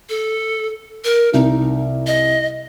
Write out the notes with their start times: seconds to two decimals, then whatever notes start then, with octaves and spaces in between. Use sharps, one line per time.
0.09 A4
1.04 A#4
1.34 C2 D#4
2.07 D#5